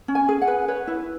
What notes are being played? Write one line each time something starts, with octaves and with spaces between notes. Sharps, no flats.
C#4
G#5
G#4
F#5
B4
B4 C#5
E4